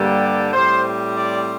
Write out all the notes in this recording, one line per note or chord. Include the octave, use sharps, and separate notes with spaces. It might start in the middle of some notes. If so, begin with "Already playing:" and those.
Already playing: G2 D3 G3 A#3
D5
A2 G3 C4 C5
D5